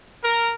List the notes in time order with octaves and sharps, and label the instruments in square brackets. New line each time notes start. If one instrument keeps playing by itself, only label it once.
[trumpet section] A#4